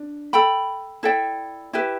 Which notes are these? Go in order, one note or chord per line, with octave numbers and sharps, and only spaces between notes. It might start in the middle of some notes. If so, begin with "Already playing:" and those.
Already playing: D4
A4 G5 B5
E4 A4 D5 G5
E4 G4 B4 E5